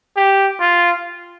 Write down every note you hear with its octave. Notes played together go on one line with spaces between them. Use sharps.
G4
F4